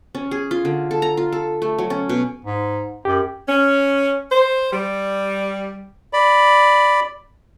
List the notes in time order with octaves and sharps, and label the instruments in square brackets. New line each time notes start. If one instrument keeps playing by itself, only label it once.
[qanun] C#4
G#4
F4
D3
A4
A#5
F4
A4
A3
F#3
C#4
B2
[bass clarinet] G#2
[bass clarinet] F#2 [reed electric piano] G4
[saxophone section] C#4
C5
G3
[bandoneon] D5 B5